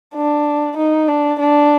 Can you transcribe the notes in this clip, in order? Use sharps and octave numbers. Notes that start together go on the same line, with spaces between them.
D4
D#4
D4
D4